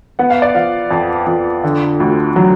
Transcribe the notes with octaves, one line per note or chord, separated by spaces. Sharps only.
B3 F#5
F5
D5
F3 F5
F2
F2
D3
D2
F#3